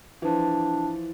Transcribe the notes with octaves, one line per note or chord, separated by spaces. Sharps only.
E3 F3 D4